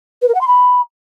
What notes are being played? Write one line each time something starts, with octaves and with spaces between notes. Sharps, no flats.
B4
A#4
F#5
C6
B5